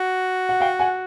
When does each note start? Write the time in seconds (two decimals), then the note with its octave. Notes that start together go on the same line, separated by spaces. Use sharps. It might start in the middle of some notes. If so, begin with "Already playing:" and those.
Already playing: F#4
0.49 F#5
0.60 F5 G5
0.79 F#5 G#5